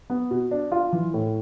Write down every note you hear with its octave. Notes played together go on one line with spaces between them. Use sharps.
B3
B2
D4
F4
E3
A2